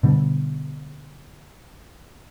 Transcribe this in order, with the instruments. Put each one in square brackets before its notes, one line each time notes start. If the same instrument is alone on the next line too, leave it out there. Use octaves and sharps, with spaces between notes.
[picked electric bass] B2 D3 G3